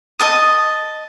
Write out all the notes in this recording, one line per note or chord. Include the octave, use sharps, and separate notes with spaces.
D#5 A5 D#6